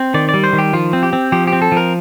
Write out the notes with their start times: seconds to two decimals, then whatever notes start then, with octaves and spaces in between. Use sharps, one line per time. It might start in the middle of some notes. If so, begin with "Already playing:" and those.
Already playing: C4
0.14 D#3 D5
0.29 D5
0.34 G3
0.44 C5
0.53 D#3
0.58 G4
0.73 F3 F4
0.93 C4
1.03 G4
1.13 C4
1.32 F3 G4
1.47 G4
1.53 C4
1.62 A4
1.72 F3
1.77 A#4